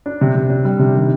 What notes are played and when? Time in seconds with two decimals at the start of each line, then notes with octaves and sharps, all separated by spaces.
0.06 D4
0.21 C3
0.35 C3
0.50 D4
0.65 G3
0.79 C3
0.94 D#3